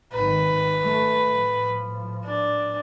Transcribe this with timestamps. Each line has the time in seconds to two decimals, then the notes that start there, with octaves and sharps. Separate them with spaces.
0.13 G#1 D#3 B4
0.83 A3
1.29 A2 F3
2.25 D4